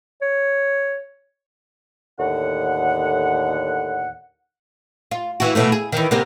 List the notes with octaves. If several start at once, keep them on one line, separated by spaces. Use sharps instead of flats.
C#5
D#2 A2 D3 F#5
F4
E3 F#4
B2 E3 A3
G#4
D#3 E3
C3 A#3 B3